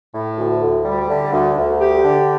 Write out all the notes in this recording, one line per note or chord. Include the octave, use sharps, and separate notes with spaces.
A2
D2
D2
G3
D3
D2
D2
G4
D3